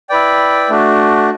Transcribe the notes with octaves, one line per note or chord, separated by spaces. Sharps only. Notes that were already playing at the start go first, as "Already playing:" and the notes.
E4 B4 D5 G5
A3 D4 F#4